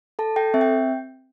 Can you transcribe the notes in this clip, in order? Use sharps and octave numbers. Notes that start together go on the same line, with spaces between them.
A4 A5
A4 G5
C4 E5
G5